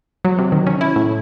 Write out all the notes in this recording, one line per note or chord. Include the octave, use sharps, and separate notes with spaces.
F#3
C3
D#3
C#4
E4
A2